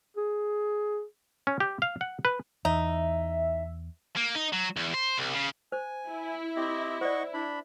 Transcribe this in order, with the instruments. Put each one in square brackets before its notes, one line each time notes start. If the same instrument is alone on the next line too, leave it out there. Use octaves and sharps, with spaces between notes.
[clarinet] G#4
[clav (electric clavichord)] C#4
G4
F5
F#5
B4
[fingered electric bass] E2 [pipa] D#4 [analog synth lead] E5
[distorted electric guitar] A#3
D#4
F#3
E2
C5
C2
C#3
[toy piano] C5 [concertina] G#5
[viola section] E4
[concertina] C4 G4 D#5
[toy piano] C5 D5 [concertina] D#5 F#5 C#6
[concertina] D4 B5